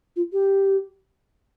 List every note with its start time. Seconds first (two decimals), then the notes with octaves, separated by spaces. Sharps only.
0.16 F4
0.33 G4